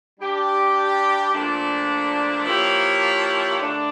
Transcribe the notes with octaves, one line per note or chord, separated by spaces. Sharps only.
G3 D4 G4
A#2 F3 A3 D4
F3 A#3 E4 G4 C#5
D3 A3 D4